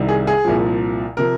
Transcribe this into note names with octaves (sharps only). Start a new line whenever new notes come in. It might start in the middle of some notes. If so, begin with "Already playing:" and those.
Already playing: C2 C3 D#3 G3
G#4
G#4
C2 A#2 F3
C3 F3 A#4